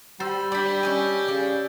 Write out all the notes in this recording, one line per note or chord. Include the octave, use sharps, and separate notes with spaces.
G3 C5 E6 A6
D4 G4 D5 B5 G6
C#4 D#5 G#5
C#3 D5